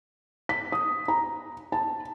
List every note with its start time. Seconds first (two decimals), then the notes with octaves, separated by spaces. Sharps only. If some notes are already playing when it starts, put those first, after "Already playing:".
0.49 B6
0.72 D#6
1.08 A#5
1.72 A5